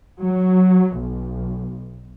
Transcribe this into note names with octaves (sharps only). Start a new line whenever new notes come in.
F#3
B1